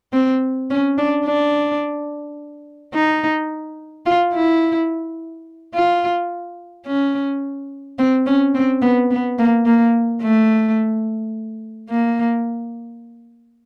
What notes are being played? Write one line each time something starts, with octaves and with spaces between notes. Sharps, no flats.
C4
C#4
D4
D4
D#4
F4
E4
F4
C#4
C4
C#4
C4
B3
B3
A#3
A#3
A3
A#3